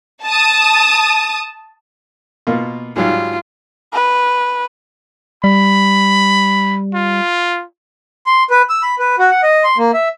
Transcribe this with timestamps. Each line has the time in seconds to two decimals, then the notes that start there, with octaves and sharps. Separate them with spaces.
0.24 A5 D#6
2.47 B2 A#3 F4
2.96 G#2 F#3 G3 F4
3.93 B4
5.44 G3 B5
6.94 F4
8.26 C6
8.50 B4
8.70 E6
8.83 B5
8.99 B4
9.19 F#4
9.31 F#5
9.43 D#5
9.64 C6
9.78 A#3
9.94 E5